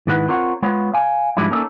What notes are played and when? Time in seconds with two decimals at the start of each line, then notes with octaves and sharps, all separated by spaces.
0.07 G#2 D#3 G#3 E4 B4 F#5
0.28 C4 F4 A#4 C#5 F#5
0.62 G#3 B3 F4 C#5
0.94 F5 G#5
1.37 G#2 F3 G3 G#3 D4 E4
1.50 A#3 C#4 D#4 G#4 A4